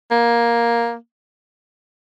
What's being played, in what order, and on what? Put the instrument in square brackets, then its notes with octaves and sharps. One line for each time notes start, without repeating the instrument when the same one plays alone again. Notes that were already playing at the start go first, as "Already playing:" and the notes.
[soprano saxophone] A#3